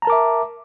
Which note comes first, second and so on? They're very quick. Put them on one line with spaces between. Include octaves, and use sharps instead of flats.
A#5 A5 A#4 D6 E5